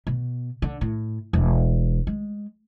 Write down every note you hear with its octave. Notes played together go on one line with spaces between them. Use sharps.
B2
D3
A2
E1
G#3